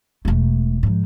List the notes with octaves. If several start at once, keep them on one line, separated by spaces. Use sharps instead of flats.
E1 A3
G#2 F3